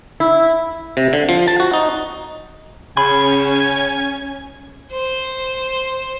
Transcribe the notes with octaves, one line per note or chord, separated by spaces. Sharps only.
E4
C3
D3
F3
A5
F#4
D#4
C#3 C#4 G#5 B5
C5